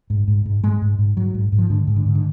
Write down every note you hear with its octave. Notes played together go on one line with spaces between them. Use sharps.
G#2
G#2
G#2
G#2 G#3
G#2
G#2
G#2 F#3
G#2
G#2
F3
G#2 D3
G#2
D3
G#2
D3